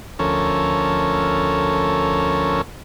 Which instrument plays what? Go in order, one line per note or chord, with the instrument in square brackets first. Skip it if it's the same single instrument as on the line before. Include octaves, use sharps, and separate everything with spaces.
[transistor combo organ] D2 F3 C#4 A4 A#4 C#5